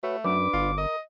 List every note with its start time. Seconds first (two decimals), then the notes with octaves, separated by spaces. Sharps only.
0.03 A3 F#4 B4 C#5
0.24 F#2 D4 B4 D6
0.54 G1 F4
0.78 A#4 D#5